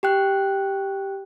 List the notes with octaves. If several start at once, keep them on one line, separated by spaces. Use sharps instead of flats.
G4 G5 F#6